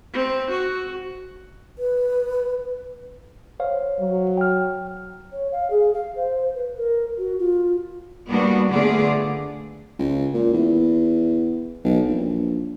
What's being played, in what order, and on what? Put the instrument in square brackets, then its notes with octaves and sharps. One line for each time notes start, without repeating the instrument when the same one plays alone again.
[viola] C4
F#4
[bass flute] B4
[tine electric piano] C5 C#5 F5
[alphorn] F#3
[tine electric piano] G5 F6
[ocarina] C#5
F5
G#4
F5
C5
B4
A#4
F#4
F4
[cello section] G3 A#3 B3 D4 F#4
D3 A3 B3 F4 G#4 D5
[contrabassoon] C#2
A#2
E2
B1
A#1